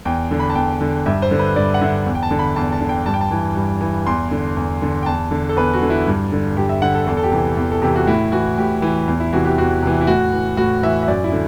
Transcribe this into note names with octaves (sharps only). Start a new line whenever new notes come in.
E2 G5
D3
B5
A5
E2 G5
D3
G2 E5
C5
D3
B4
G2 D5
F#5
D3 E5
E2
G5
A5
D3
B5
E2 A5
A5
D3
G5
G2 A5
G5
A5
E3
G2
E3
E2 C6
D3
E2
D3
G5
E2 A5
D3
A4
E2 B4
F#4
D3
E4
G2
D3
G2 G4
E5
D3 F#5
A4
E2 A4
A4
G4
C3 E3
E2
A4
C3 E3 G4
F#4
A2 E4
E3 F#4
A2 G4
E3
E2
E4
C3 E3 F#4
G4
E2 F#4
C3 E3
E4
A2 F#4
E3
A2 F#4
E3 E5
E5
F#2 D5
E4
D3